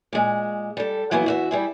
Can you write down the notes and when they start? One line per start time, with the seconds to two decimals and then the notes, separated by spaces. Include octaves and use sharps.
0.13 A#2 G#3
0.77 G3 A4
1.11 E3 F#3 A#3 B3 E4
1.26 E2 F#4 E5
1.51 G3 E4 G#4